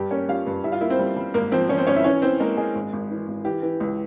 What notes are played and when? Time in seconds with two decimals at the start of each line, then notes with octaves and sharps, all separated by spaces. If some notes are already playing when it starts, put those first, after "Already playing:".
Already playing: G2 G4
0.11 A#3 C#4 C#5
0.29 G3 F4 F5
0.46 G2
0.64 G3 E4 E5
0.72 F4 F5
0.81 A#3 E4 E5
0.90 C4 C5
0.99 G3
1.16 G3
1.34 G#1 A#3 A#4
1.52 F3 C4 C5
1.69 F3 C#4 C#5
1.78 C4 C5
1.87 G#1 C#4 C#5
1.96 E4 E5
2.04 E3 C#4 C#5
2.22 E3 C4 C5
2.40 G#3 A#3 A#4
2.57 G#3 G#4
2.75 G#1
2.93 G#1
3.11 E3
3.28 G#1
3.45 E3 G4
3.62 E3
3.80 C#2